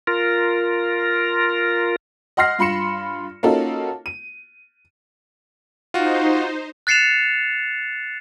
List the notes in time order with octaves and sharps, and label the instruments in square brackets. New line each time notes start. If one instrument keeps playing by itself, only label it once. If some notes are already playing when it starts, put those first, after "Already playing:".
[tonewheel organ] F4 A#4
[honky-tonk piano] D#5 F#5 C6 F6 A#6 C7
G2 F4 B5 C6 C#7 E7
A#3 C#4 D#4 F4 F#4 A4
D#7
[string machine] D#4 C5 [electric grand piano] F4 F#4
[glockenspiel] F#6 A6 C7 C#7 E7 F7